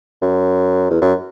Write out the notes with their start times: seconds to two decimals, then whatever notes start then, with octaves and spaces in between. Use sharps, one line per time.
0.22 F#2
0.90 E2
1.01 F#2